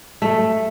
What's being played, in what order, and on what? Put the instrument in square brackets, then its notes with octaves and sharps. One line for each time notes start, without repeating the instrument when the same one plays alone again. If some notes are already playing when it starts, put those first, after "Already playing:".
[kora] A3